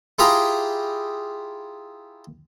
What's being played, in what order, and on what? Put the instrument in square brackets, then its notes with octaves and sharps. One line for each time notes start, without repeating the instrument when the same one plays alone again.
[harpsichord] E4 F4 G4 G#4 A#5 B5